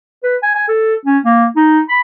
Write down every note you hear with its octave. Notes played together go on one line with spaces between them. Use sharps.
B4
G#5
G#5
A4
C#4
A#3
D#4
B5